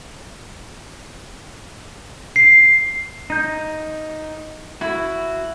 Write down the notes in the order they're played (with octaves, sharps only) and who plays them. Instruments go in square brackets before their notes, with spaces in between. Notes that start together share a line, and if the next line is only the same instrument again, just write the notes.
[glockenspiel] C7
[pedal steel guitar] D#4 G6
[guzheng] E4 [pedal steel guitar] F#4